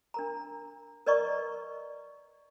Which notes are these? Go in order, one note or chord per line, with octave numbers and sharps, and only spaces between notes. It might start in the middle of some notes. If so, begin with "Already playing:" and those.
D4 A#4 A#5
A#4 B4 D5 D#5 A#5 C#6